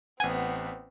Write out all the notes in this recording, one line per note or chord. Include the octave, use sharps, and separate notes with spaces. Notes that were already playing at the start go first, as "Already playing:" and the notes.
A1 B3 C4 F#5 G#5